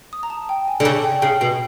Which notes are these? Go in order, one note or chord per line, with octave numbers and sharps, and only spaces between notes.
D#6
A#5
A5
G5
G#5
D3
C#3 A5
G5
C#3 G5
B2